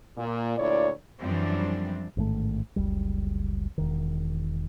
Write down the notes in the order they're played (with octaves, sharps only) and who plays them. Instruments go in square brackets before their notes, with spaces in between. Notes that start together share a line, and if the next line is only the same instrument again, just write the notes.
[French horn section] A#2
D2 A#2 E4 C#5 D5
[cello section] F#2 E3 F3 G3 C4 D4
[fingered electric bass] A1 G#2 D#3 A3
F#1 C#2 G3
E1 D#3